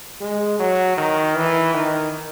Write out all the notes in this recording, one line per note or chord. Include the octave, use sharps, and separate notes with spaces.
G#3
F#3
D#3
E3
D#3